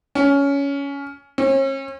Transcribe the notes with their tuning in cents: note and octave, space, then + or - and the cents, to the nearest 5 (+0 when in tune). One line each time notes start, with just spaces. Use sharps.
C#4 +15
C#4 -40